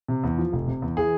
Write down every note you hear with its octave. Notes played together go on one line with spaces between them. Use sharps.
C3
E2
F3
F1
C3
E2
E3 G#4